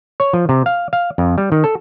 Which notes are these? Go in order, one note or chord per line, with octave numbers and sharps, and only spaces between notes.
C#5
F3
C3
F5
F5
F2
G3
D#3
A4